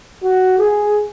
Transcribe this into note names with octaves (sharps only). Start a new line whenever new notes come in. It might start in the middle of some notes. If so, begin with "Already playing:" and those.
F#4
G#4